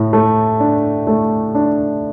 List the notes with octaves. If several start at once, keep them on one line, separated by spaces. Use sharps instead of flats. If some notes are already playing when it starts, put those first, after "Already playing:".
Already playing: A2
A3
D4
A3
D4